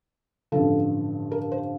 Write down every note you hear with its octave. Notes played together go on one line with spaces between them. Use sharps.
A1 G2 D3 F3 A4
A#4
C5